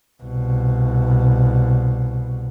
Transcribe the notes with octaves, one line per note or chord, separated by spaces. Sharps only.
C2 B2